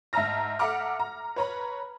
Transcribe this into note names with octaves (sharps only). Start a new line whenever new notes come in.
G#2 E5 A5 A#5 F6 A#6
A4 E5 F#5 A#5 D6 F6
A#5
B4 C#5 A#5 B5